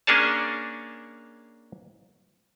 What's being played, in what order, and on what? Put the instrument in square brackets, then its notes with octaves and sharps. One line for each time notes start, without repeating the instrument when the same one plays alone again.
[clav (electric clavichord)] A#3 C#4 D4 G#4 C#5 A5